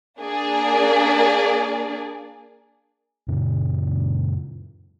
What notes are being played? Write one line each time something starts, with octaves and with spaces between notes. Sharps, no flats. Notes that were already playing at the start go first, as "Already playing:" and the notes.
A#3 D4 G#4 D5
F#2 A#2 C#3